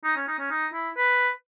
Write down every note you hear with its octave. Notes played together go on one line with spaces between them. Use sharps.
D#4
C#4
D#4
C#4
D#4
E4
B4